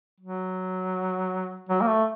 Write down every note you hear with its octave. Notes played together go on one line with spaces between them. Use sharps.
F#3
F#3
A#3
A3